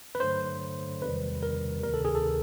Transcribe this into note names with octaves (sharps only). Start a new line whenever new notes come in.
B4
G2 D3 F#3 A3 C5
E2 C3 D#3 G3 B4
A#4
D2 C3 D#3 A#4
A4
G#4
A4